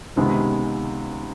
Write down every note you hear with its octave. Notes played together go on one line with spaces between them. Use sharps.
C#2 C3 D#3 G#3 B3